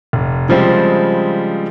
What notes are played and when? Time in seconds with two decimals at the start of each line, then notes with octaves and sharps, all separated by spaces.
0.13 F1
0.49 C#3 F3 G3 G#3 C4